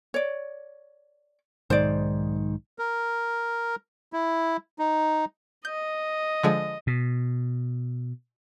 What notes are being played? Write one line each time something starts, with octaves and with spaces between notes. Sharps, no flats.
C#5 D5
B1 G#2 D#3 C5 D5
A#4
E4
D#4
D#5 G6
D3 F3 G#3
B2